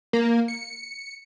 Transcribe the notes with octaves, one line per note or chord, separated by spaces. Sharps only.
A#3
C#7